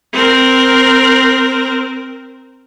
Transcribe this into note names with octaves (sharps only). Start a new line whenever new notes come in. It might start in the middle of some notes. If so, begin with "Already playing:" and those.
C4 A#4